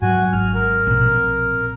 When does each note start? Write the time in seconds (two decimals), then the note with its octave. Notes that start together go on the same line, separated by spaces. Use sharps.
0.02 G#2 F#3 F#4 G#5
0.33 G#1 F6
0.55 A#4
0.87 A#1 B2 C4